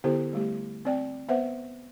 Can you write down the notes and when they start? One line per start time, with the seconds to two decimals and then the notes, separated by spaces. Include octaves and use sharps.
0.04 D3 B3 E4 G4 A4 C5
0.33 G3 A3 G4
0.85 C4 D5 G5
1.29 B3 B4 C5 E5 F#5